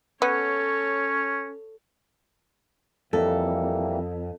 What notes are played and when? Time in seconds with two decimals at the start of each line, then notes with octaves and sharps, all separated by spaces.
0.22 B3 C#4 A4 C#5
3.13 F2 E3 G3 A#3 A4